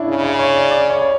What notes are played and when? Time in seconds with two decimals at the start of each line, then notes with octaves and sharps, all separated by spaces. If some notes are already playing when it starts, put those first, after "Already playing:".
Already playing: C#4 D4 E4
0.09 C#3
0.24 C#5
0.39 C#5
0.55 D5
0.70 D5
0.90 C#5
1.02 C#5